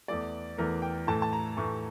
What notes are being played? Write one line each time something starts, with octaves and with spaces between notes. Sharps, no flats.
E2 E3 A3 D5
E2 E3 A3 A#4
G5
A2 E3 A3 A5
A5
A#5
A2 E3 A3 C#6